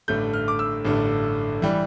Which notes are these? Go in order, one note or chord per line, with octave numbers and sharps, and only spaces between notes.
A1 G2 D3 A3 G6
F6
D6
E6
A1 G2 D3 A3
E3 G3